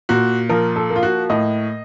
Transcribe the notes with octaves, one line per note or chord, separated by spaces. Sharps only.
A#2 F#4
F3 A#4
A4
A#3
F4
F#4
A2 D#5